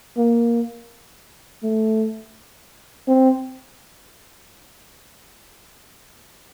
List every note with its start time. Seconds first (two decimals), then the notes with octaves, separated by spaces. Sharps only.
0.17 A#3
1.63 A3
3.08 C4